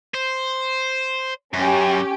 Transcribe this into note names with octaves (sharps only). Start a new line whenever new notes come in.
C5
F#2 C#4 G4